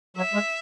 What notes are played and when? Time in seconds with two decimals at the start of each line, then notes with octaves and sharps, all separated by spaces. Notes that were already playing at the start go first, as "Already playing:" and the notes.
0.17 F#3 E5
0.34 G#3